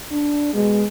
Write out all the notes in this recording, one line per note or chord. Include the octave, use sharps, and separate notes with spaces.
D4
B2 G#3